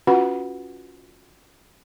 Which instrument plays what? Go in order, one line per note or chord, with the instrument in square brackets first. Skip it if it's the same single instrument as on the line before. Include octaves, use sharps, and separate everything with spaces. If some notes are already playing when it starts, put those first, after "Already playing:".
[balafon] C#4 F4 F#4 B4 F#5 B5